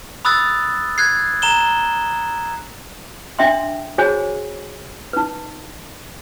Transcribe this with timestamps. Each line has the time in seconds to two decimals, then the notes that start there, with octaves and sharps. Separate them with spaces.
0.25 B5 D#6 E6 F#6 A6
0.98 F#6 G#6 C7
1.42 A#5 E7 G7
3.39 D4 E5 G5 C6
3.98 F#4 G#4 C5 C#5 G#5
5.13 D#4 B4